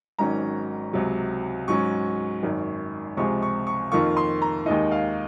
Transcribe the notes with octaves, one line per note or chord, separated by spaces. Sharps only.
G#1 G#2 D#3 F#3 C#4 A#5
C#2 C3 F#3
G#2 F#3 C#4 C#6
G#1 F#2 D#3
C#2 C3 F3 G#3 C#6
C#6
C#6
F2 D#3 A#3 F4 C#6
C6
A#5
D#2 D#3 G#3 D#4 D#5
F5